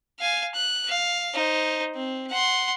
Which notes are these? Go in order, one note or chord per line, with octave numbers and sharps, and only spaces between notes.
F5 G#5
F#6
F5
D#4 C5
C4
F#5 C6